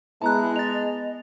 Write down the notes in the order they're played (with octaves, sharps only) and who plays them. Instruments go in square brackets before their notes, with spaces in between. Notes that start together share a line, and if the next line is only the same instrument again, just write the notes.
[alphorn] G#3 [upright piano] B3 [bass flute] E4 [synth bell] A5 A#5 F#6
[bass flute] D#5 [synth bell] A6 F7